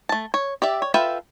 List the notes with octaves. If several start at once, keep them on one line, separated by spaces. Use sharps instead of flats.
A3 A5
C#5
G4 D5 E5
C#5
F4 A4 B4 E5 G5